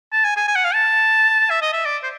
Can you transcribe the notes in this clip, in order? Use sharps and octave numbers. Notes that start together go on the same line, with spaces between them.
A5
G#5
G#5
G#5
F#5
F5
A5
E5
D#5
E5
D5
C5